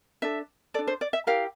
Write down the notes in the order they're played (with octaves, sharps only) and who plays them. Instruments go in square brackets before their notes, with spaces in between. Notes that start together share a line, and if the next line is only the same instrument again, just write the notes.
[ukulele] D4 A4 E5
A4 D5
D4
C5
D5
E5
E4 G4 A#4 F5